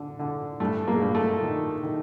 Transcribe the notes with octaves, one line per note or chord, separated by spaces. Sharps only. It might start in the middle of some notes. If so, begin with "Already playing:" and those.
Already playing: D3
D3
G2 A3
G#3 A#3
G2
A3
D#3
D#3